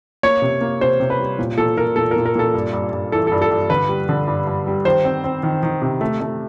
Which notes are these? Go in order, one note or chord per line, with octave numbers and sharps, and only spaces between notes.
A#3 C#5
C3
A#3
C3 C5
C3
B4
G3
A#2
A#2 A4
A#2 A#4
A#2 A4
A#4
A#2
A#4
A#2 A4
G2
G2
G2
E3 A4
A4
G2
A4
G2
D3 B4
G3
D3
G2
G2
G3
D#3 C5
C4
C4
D#3
D#3
C3
A3
A3